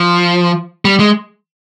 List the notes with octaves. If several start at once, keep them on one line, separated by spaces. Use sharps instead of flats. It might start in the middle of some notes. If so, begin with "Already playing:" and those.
Already playing: F3
G3
G#3